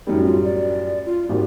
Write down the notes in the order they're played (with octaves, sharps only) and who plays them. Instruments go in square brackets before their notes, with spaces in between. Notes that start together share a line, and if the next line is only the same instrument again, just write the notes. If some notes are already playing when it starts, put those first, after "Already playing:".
[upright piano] F#2 A2 G3 [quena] D#4
[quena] F4
D5
F4
[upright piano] G#1 A#3 F#4 [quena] G4